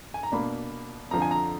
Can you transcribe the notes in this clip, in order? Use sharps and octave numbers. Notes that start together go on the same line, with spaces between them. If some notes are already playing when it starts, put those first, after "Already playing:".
G#5
A#5
B2 A#3 D4 B5
F2 D3 F3 A#5
G#5
A#5